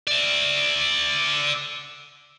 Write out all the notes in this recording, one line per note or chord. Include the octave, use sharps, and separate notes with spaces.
D5 E5